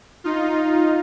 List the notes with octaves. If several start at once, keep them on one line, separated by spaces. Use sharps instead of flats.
D#4 F4